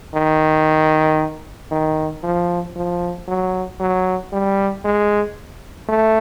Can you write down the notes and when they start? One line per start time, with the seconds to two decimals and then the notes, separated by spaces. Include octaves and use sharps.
0.14 D#3
1.71 D#3
2.23 F3
2.76 F3
3.28 F#3
3.80 F#3
4.32 G3
4.85 G#3
5.89 A3